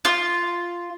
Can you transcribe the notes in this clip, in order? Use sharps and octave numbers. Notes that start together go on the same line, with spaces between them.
F4